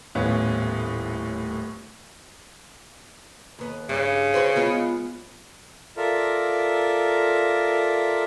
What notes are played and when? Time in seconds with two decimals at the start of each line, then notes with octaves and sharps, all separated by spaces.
0.15 D#1 A2 B3 C#4
3.59 D#2 B3
3.89 G2 C#3
4.34 F#4 B4 C5
4.56 G#3 B3 F4
5.97 F4 A4 A#4 D5 E5 A#5